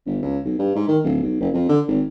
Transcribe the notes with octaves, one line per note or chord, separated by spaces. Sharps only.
G1
C#2
B1
G2
G#2
D#3
D1
B1
F#1
F2
D3
G#1